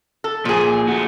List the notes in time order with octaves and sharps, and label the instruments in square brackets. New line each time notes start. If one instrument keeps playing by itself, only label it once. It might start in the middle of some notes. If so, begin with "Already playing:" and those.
[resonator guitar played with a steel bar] A4
[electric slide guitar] A#2 [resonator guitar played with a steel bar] F3 G#4
[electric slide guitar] A3 F#4